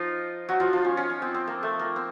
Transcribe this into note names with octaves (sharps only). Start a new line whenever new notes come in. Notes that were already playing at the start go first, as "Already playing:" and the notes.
Already playing: F3 D#4 F4
F#3 F#4
F3 F4
F3 F4
C#4
C#4
C#4
C4
C4
A#3
A3
A#3
C4